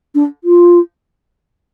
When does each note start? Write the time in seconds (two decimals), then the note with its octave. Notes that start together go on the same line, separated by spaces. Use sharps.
0.15 D4
0.44 F4